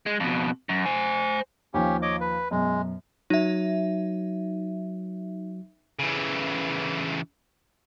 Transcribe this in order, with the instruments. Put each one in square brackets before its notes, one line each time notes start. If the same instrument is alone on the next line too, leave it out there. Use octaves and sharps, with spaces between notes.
[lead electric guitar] G#3
F2 B2
F#2
C5 G#5
[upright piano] D#2 F3 [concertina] C#4 G4
[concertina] C#5 D#5 D6
B4
[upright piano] F#2 B2 [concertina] G#3
[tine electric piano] F#3 [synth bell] D#4 E5
[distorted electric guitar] C#3 E3